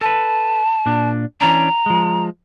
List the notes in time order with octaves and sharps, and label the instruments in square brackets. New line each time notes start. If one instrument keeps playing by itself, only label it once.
[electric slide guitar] A4 B4 [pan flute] A5
[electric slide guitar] A#2 D4
[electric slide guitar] E3 C#4 D4 [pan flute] A#5
[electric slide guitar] F3 G#3